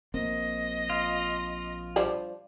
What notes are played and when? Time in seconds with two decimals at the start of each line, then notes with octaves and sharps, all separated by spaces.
0.14 A#1 A#3 C4 D#5
0.90 F4
1.96 F3 G3 D4